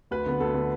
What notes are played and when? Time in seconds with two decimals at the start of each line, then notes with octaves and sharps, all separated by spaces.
0.11 D2 B4
0.26 D3 B3
0.40 D2 A4
0.54 D3 B3